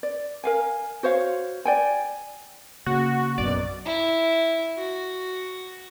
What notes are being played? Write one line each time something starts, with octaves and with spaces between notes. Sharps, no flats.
D5
A#4 F5 G#5
F#4 C5 C#5 F5
D5 G5 G#5
C#3 A#3 F#4
A#1 F#2 B2 D5
E4
F#4